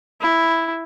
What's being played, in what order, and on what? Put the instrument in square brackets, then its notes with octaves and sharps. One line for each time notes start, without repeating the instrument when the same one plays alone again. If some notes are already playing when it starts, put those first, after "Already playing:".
[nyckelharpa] E4